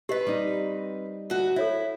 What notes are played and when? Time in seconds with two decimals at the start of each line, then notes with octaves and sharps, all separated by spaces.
0.09 C4 G4 B4 D#5
0.27 G3 D#4
1.30 D2 F#4
1.56 E4 A4 C#5 E5